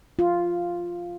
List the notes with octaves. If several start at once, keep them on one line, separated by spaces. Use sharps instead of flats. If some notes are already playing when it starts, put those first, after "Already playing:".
F4